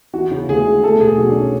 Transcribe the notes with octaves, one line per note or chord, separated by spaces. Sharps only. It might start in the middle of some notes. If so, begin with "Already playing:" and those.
E3 F#4
C#3
D2 G#4
G#3
A3 A4
B2 G#4
B1 F#4
D4
C#4